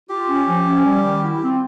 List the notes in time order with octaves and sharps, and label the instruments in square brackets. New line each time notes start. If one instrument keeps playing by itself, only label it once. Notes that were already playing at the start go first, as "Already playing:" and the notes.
[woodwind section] F4 [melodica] G4
[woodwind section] C#4
F3
C#4
G3
D#3
[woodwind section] E4 [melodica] F#4
[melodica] G4
[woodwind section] C4
[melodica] F4